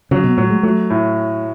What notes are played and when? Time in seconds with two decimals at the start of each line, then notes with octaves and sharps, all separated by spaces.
0.11 C#3 F#3
0.24 B2
0.37 A2 F#3
0.50 G#3
0.63 F#3 A3
0.90 A2